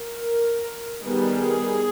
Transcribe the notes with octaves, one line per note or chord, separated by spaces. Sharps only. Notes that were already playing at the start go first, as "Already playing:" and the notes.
Already playing: A#4
D#3 G3 B3 G#4